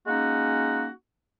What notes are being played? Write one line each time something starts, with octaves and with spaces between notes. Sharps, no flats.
G#3 A#3 C#4 D#4 F#4